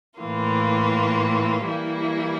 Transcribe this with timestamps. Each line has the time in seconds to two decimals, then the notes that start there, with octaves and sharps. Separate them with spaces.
0.20 A2 E3 A#3 F4
1.67 E3 G3 A#3 E4